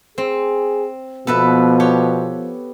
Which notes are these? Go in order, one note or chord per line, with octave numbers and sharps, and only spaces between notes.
C4 G#4
B2 F3 B3 A4 B4 E5
G4 C#5